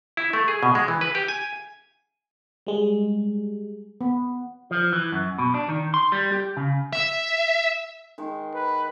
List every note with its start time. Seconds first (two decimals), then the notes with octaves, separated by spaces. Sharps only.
0.17 E4
0.33 A3
0.48 G#4
0.63 B2
0.75 G#3
0.88 E3
1.01 B4
1.15 G4
1.28 G#5
2.67 G3 G#3
4.01 B3
4.71 F3
4.93 E3
5.12 F#2
5.38 B2
5.54 D4
5.69 D#3
5.94 C6
6.12 G3
6.32 G4
6.57 C#3
6.93 E5
8.18 D#3 G#3
8.55 B4